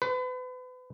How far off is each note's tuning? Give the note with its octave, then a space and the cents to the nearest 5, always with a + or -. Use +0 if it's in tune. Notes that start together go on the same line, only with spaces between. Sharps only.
B4 +35